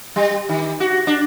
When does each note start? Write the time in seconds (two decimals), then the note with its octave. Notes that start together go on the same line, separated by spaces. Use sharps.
0.16 G3
0.49 D#3
0.80 F#4
1.07 D4